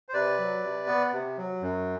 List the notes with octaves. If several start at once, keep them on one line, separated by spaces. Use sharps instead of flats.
C5
C3 B4 D5
F#3
C3
B3
C3
F#3
F#2